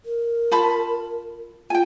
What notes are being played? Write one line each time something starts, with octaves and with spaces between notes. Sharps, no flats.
A#4
F4 A5 B5
F4 G5 G#5